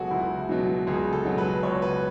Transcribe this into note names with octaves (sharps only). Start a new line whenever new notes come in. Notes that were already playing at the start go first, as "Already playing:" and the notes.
Already playing: C#2 B2 F#3 F#4 G#4 A4 B4
C#2 E4
B2 F#3
C#2 G#4
A4
B2 F#3
B4
C#2 C#5
B4